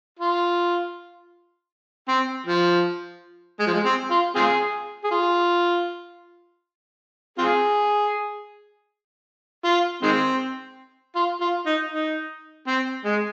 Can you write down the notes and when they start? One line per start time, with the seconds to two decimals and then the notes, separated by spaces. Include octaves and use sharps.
0.19 F4
2.08 C4
2.46 F3
3.60 G#3
3.67 F3
3.74 G#3
3.85 C4
4.10 F4
4.35 C4 F4 G#4
5.04 G#4
5.11 F4
7.38 C4 F4 G#4
9.65 F4
10.03 D#3 G#3 C4
11.16 F4
11.41 F4
11.66 D#4
11.92 D#4
12.67 C4
13.05 G#3